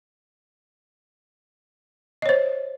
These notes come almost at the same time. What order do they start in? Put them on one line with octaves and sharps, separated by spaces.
D#5 C#5 C5